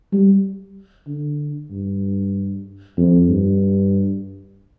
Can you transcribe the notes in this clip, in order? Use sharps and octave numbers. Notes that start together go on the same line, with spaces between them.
G3
D3
G2
F2
G2